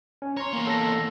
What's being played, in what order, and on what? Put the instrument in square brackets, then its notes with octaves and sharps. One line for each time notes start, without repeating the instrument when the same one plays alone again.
[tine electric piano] C#4
[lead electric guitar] C#5 [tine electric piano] A#5 C6
[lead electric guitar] E2 A#3
[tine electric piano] A4 A#6